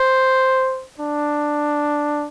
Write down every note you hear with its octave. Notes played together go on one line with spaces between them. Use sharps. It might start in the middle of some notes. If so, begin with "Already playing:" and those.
Already playing: C5
D4